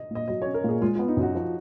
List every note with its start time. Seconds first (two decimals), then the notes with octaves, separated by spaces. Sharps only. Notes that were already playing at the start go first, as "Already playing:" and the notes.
Already playing: D#5
0.11 A#2 D#5
0.28 F#3 D#5
0.42 C#5
0.46 C#4
0.54 A#4
0.64 A#2 G#4
0.82 G#3 F4
0.95 F4
0.99 B3
1.08 D#4
1.17 F#2 F#4
1.35 F3